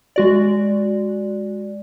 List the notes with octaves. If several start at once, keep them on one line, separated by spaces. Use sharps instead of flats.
G#3 F#4 D5